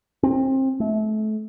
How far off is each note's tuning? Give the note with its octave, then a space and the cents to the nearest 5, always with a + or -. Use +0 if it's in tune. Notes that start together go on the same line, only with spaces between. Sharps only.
C4 +25
A3 -30